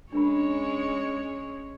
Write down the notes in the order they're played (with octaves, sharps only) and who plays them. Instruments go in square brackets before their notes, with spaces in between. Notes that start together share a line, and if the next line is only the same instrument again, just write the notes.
[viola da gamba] G#3 C#4 C#5 [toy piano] D4 A#4 B5